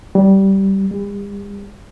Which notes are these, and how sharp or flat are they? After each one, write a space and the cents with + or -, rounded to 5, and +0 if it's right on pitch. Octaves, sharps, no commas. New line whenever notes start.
G3 -15
G3 +45